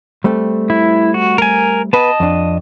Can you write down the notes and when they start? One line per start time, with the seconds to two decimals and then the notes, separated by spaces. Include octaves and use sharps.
0.24 G3 A3 C4
0.70 E4
1.14 F#4
1.38 A#4 G#5
1.93 B3 B4 D#5 A5
2.20 F2 D4